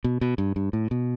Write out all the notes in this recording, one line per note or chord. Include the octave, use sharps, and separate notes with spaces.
B2
B2
G2
G2
A2
B2